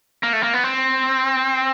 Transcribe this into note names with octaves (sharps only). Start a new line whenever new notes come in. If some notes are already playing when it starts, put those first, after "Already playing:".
A#3
A3
A#3
B3
C4